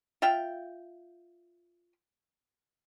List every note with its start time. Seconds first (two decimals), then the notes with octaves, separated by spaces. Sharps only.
0.22 F4 E5 F5 G5